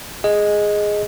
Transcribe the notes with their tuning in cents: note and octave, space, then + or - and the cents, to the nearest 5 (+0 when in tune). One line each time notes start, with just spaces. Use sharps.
G#4 +0 D#5 +0